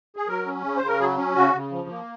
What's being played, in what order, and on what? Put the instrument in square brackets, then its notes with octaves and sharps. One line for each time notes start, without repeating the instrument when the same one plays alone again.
[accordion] G#4
F#3 A#4
C#4
C#3
C5
C#3
A#4
F#3 G#4
C#4
C#3 F#4
C#3
F3
A#3